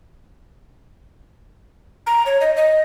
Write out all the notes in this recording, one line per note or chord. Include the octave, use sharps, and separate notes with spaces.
A#5
C#5
D#5
D#5